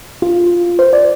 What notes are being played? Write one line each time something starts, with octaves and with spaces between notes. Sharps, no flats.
F4
C5
D5